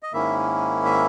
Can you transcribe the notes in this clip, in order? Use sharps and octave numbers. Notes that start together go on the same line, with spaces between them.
D#5
G#2 D#3 A#3 C#4 E4 E5
E5